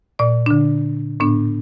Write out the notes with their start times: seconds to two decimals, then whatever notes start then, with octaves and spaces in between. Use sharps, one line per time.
0.19 A#2 D5
0.46 D3 D4
1.20 A2 B3 D4